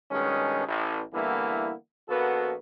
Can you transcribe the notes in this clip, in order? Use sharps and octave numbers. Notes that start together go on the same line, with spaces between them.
G2 B2 D#3 G#3 C#4
A1
D3 E3 G3 A#3 B3 E4
A#1 A#3 B3 F#4 A4 B4